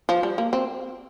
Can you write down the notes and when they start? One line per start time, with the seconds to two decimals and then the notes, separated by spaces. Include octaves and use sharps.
0.09 F3
0.23 G3
0.38 A#3
0.53 C4